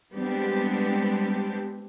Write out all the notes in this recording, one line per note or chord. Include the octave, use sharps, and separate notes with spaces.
G3 G#3 B3 C4 D4 G4